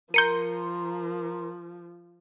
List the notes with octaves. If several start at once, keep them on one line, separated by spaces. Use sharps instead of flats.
F3 A#4 A#5 C6 G6 C#7 D#7